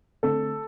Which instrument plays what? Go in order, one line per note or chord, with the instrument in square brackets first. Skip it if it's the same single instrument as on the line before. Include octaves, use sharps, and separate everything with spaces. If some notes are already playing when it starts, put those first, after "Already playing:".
[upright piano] D3 A3 C4 A4